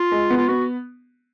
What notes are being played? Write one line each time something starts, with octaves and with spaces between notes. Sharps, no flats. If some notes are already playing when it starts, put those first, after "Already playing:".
Already playing: F4
G#3
B3
F4
B3 F#4